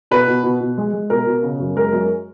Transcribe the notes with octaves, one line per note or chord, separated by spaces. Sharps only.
B2 B4
B2
B2
B2
G#3
G#3
B2 A#4
B2
C#3
F#2
G#3 A#4
F#2